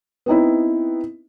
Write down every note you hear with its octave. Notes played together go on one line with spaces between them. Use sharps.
B3 C4 D#4 E4